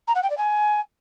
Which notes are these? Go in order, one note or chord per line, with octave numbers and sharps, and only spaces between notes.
A#5
F#5
G5
D5
G#5